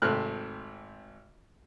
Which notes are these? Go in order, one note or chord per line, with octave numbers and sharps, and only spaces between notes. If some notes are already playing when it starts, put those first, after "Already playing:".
G#1 C3 A3 F6 F#6